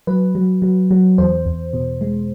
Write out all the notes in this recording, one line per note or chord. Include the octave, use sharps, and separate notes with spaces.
F#3 B4
F#3
F#3
F#3
E2 C5
E2
B2
G#3